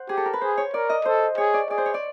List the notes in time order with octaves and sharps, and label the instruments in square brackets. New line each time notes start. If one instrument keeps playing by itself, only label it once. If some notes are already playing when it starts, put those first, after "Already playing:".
Already playing: [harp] C5 F#5
[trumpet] G4 [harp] G#4
[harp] A4
A#4
B4
[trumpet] G#4 [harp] C5
[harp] C#5
[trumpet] A#4 [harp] D5
[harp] D#5
[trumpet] A4 [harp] C5
[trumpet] G#4 [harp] C#5
[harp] D5
[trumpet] G#4 [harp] D5
[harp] C5
C#5
D5